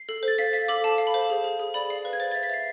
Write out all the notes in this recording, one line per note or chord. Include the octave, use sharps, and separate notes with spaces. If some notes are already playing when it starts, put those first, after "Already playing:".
Already playing: C7
A4
C5
A6
F5 B6
F5 B6
A4 D6
F5 A5
F5
B5
C5
G#4
G#4
G#4
D5 B5
F5
B4
G#6
C5 A6
E5 A6
B6
E5 C7